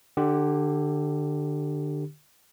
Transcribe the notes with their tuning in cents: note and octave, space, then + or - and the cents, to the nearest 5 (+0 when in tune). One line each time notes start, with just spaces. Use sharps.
D3 +25 G4 +0